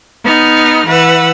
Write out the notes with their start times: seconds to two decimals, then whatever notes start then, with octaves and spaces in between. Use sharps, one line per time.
0.23 B3 D#4 F6
0.86 E3 B4 F#5 E6